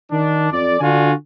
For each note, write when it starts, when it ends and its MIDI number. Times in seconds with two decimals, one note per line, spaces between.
0.10 0.49 51
0.10 0.49 62
0.51 0.77 41
0.51 0.77 74
0.80 1.12 50
0.80 1.12 62
0.80 1.12 65
0.80 1.12 66
0.80 1.12 80